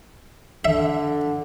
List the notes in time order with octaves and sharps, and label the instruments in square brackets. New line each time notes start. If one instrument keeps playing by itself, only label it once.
[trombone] D3 [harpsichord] E5